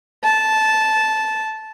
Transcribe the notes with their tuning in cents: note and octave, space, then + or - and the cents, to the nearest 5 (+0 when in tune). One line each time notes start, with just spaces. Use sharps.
A5 -10